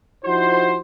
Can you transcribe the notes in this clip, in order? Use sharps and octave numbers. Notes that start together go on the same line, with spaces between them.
F3 D#4 E4 F#4 C5